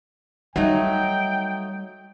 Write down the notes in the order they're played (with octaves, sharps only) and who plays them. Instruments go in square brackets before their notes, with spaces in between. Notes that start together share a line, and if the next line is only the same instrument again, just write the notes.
[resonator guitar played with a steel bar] F#3 A3 D#4 [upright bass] G3 [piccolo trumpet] G5